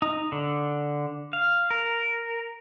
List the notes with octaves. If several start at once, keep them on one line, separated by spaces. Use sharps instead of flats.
D#4
D3
F5
A#4